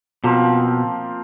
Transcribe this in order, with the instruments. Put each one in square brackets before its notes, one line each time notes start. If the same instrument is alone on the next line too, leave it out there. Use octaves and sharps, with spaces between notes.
[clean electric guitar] B2 [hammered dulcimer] F3 A#3 C4